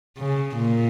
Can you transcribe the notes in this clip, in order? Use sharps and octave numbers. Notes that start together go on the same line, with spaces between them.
C#3
A#2